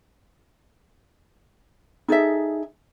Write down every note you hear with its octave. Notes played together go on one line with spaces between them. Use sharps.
D#4 G#4 A4 E5